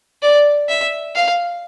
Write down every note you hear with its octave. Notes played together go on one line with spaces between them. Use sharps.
D5
E5
F5